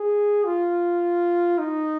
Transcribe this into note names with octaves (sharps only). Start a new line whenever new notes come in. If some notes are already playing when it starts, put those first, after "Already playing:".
Already playing: G#4
F4
D#4